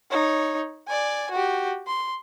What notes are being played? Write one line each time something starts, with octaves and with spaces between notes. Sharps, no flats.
D#4 C#5
D5 G#5
F#4 G4
C6